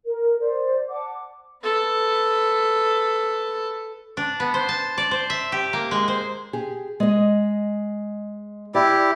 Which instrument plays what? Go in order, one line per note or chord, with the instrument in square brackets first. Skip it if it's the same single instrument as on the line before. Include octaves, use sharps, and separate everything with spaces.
[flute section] A#4
C5 D5
F#5 A5 D6
[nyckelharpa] A4 B4
[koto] D4
B3
C5
A5
D5
C5
E5
G4
A#3
G#3
C5
[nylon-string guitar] G4 G#4
G#3 D#5
[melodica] E4 G4 [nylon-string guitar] D5